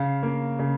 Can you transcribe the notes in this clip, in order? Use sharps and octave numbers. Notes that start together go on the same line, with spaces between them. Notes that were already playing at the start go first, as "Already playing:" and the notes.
Already playing: C#3 F5
A#3
C#3